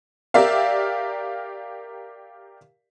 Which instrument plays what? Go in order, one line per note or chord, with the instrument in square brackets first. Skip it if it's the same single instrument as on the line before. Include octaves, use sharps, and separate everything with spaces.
[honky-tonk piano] G4 A#4 D5 E5 F5